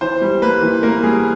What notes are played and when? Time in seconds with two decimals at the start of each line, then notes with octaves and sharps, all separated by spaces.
0.01 E3 C5
0.22 G3
0.42 A#3 B4
0.63 E3
0.83 A#3 A#4
1.03 G3 G#4